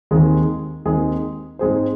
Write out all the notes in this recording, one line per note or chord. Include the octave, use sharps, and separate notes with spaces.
D#2 D#3 G#3 C4 G#4
D#2 D#3 G#3 C4 G#4
G#2 G#3 C4 G#4 C5